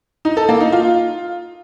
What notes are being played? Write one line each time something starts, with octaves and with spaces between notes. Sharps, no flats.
D#4
A4
A#3
D#4
F4